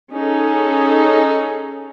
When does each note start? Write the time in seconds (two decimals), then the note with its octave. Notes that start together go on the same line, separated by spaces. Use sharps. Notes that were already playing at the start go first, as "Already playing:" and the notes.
0.15 C#4 D#4 G#4 A4